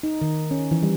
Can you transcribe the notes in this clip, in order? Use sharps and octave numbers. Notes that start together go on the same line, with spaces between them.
D#4
D#3
C#4
E3
G3